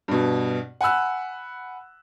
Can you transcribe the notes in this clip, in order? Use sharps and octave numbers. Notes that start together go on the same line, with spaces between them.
G2 B2
F#5 G#5 B5 E6 F#6